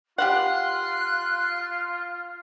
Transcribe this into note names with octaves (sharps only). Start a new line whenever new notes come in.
F4 G4 F5 F#5 C6 F#6